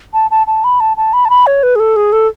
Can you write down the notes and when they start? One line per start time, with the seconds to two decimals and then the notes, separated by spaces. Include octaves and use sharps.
0.14 A5
0.31 A5
0.47 A5
0.64 B5
0.80 A5
0.97 A5
1.13 B5
1.25 A5
1.30 B5
1.47 C#5
1.63 B4
1.76 G#4
1.80 A4
1.96 G#4
2.12 A4